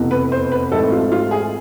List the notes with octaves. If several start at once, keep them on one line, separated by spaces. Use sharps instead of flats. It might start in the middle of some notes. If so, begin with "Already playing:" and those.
Already playing: F1 E2 B2
B4
C5
B4
G#1 G#2 E3 A3 C4 A4
F4
F4
G#4